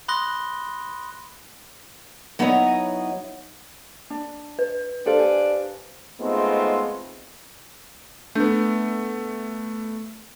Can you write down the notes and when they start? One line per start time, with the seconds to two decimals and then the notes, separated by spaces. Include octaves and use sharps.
0.08 B5 C6 D#6 F#6 A#6 G7
2.39 F#3 B3 D#4 E4 C#5 D#5
4.10 D4
4.59 B4
5.06 D4 G4 A4 C5 F5
5.20 G#5
6.19 G#3 A3 B3 C4 D#4 F4
8.35 A3 B3 D4 G6